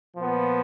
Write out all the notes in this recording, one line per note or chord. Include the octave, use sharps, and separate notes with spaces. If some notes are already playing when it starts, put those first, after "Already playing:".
A#2 F3 B3